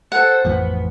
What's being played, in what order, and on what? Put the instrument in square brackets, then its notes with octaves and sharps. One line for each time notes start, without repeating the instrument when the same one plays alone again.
[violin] A4 C5 [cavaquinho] F#5
[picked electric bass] A1 F2 F3 [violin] B3